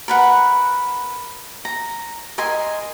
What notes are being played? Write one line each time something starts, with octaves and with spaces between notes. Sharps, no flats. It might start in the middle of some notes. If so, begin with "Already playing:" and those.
A#4 B4 F#5
A#5
A#4 D#5 G#5 C6